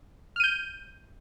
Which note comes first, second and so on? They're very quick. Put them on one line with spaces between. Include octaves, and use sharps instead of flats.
F6 D#7 G6